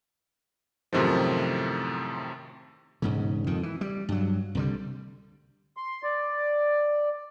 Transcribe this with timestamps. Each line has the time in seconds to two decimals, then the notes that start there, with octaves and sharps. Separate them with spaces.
0.93 F#2 A2 C3 D#3 F3
3.02 E1 G#2 C#3
3.47 F2 D#3
3.63 E3
3.81 G3
4.09 G2 F#3
4.55 C2 D3 G3
5.77 C6
6.03 D5